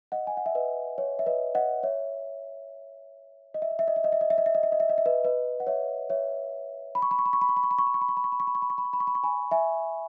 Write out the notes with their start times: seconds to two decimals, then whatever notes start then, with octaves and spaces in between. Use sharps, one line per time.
0.12 D#5 F#5
0.27 G#5
0.37 F#5
0.46 E5
0.55 B4 D#5
0.98 C#5
1.19 E5
1.26 B4 D#5
1.55 D#5 F#5
1.83 C#5 E5
3.54 D#5
3.62 E5
3.71 D#5
3.79 E5
3.88 D#5
3.96 E5
4.04 D#5
4.12 E5
4.21 D#5
4.30 E5
4.38 D#5
4.46 E5
4.55 D#5
4.63 E5
4.72 D#5
4.80 E5
4.89 D#5
4.98 E5
5.06 B4 D#5
5.24 B4 D#5
5.60 F#5
5.67 C#5 E5
6.10 C#5 E5
6.95 B5
7.02 C#6
7.11 B5
7.19 C#6
7.26 B5
7.33 C#6
7.41 B5
7.49 C#6
7.57 B5
7.63 C#6
7.71 B5
7.79 C#6
7.87 B5
7.94 C#6
8.01 B5
8.09 C#6
8.17 B5
8.24 C#6
8.32 B5
8.40 C#6
8.47 B5
8.55 C#6
8.62 B5
8.70 C#6
8.78 B5
8.85 C#6
8.93 B5
9.00 C#6
9.07 B5
9.15 C#6
9.23 G#5 B5
9.51 E5 G#5